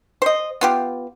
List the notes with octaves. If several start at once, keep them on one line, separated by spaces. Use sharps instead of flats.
C5 D#5
B3 F4 G4